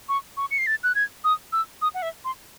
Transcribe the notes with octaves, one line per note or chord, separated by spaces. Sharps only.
C#6
C#6
C#7
C7
A6
F#6
G#6
D#6
E6
D#6
F#5
E5
C6